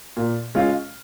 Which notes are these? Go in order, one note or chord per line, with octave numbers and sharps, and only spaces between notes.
A#2
G#3 C#4 F4